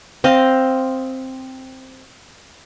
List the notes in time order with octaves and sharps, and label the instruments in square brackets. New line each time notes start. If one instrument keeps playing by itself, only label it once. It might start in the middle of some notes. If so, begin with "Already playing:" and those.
[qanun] C4 C5 D#5 F5